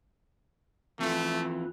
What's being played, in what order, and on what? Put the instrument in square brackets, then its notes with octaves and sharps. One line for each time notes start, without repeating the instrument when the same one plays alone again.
[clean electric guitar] F2 E3 [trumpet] A3